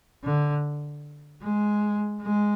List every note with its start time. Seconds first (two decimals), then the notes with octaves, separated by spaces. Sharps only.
0.24 D3
1.42 G#3
2.22 G#3